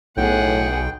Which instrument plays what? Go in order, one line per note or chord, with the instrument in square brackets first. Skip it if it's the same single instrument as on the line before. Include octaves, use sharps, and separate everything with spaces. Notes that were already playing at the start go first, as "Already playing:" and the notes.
[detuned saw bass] B1 [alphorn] A2 [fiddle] G#4 F#5 [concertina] G5